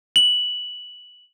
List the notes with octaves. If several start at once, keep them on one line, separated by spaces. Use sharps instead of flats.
F#7